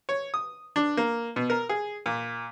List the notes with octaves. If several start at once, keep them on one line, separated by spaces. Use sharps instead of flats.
C#5
D#6
D4
A#3
B2
A#4
G#4
A#2